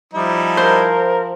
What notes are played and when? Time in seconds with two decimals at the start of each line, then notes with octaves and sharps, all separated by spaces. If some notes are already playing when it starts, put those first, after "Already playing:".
0.14 F3 G3 D#4 E4
0.57 A#4 C5